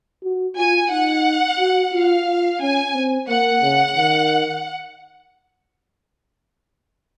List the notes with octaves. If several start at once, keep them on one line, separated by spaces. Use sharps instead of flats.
F#4
F4 G#5
D#4 F#5
F#4
F4 F5
F4
C#4 G#5
C4
A#3 F#5
C#3
D#3